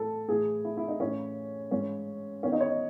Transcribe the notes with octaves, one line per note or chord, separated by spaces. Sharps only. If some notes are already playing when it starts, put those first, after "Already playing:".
Already playing: A2 E3 A4
A2 E3 G#4
E4
E4
D#4
A2 E3 C#4
G#2 E3 C#4
E2 D#3 C#4
D#4
C#5
D#5